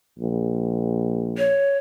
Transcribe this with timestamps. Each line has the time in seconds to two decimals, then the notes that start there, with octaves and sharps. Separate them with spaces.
0.18 A#1
1.38 C#5